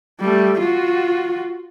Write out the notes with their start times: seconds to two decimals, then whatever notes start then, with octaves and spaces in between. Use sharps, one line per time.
0.20 G3 A3
0.59 F4 F#4